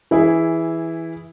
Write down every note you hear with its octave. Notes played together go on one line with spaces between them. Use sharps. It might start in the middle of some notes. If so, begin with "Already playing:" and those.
E3 E4 G#4